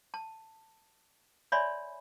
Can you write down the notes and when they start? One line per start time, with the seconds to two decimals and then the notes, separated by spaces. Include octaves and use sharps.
0.14 A5
1.52 C#5 D5 E5 G#5 B5 C6